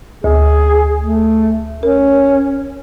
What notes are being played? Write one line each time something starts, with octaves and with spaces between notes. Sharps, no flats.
D2 G#4
A3
C#4 A#4